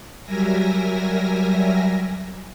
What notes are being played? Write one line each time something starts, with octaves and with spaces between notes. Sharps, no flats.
F#3 G3 A#4 E5 G#5 A#6